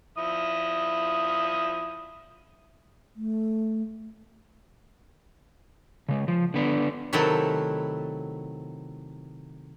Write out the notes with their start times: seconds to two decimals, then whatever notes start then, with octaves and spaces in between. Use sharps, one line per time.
0.18 F3 E4 D#6
3.16 A3
6.09 C#3 G#3
6.28 F3
6.54 D3 B3 D4
7.13 C3 D#3 F#3 A3 E4 A4